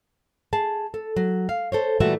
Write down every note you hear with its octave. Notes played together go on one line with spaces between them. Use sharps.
G#4 A5
A4
F#3
F5
A4 C5 C#5
A#2 E3 G3 A3 F#4 E5